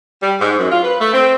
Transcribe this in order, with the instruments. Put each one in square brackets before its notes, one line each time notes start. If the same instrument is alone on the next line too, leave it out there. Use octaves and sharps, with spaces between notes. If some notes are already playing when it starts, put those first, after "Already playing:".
[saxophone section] G3
G#2
F#2
F4
B4
A3
C4